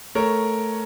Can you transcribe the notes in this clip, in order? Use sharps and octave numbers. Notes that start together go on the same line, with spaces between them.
A3 A#4 C#5